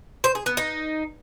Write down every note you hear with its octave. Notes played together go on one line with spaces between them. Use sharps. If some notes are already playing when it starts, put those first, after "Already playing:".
C5
G#4
B3
D#4